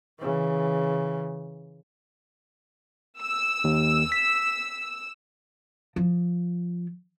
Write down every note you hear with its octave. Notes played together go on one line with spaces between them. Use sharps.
C#3 E3
E6
D#2
B6
F3